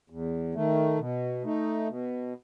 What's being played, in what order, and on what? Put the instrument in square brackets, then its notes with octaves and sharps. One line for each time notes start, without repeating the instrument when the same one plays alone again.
[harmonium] E2
D#3 A3
B2
A3 D#4
B2